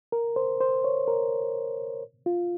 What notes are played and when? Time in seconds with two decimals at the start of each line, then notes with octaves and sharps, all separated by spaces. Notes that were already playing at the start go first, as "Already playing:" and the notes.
0.12 A#4
0.36 C5
0.60 C5
0.84 C#5
1.08 A#4
2.26 F4